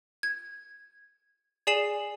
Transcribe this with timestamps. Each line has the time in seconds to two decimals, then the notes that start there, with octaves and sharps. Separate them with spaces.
0.23 G#6
1.67 G#4 D5 G#5 C7 E7 F#7